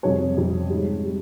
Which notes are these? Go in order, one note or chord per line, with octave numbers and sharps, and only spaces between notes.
F2 C3 G3 C#5
F2 C3 G3
G#2 G3
G3